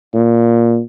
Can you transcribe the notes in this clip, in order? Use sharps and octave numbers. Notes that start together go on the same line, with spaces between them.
A#2